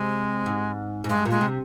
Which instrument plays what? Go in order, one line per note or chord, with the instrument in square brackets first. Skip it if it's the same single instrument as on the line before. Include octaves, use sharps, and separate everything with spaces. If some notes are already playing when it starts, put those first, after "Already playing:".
Already playing: [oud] C3 [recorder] G#3
[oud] G#2
G#2
[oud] G2 [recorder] G#3
[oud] A#2 [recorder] G#3
[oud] C3